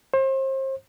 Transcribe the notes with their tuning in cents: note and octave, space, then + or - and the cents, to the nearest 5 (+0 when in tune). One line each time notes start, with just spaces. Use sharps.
C5 +35